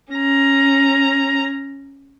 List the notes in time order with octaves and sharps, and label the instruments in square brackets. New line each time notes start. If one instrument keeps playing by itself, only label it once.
[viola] C#4 A#5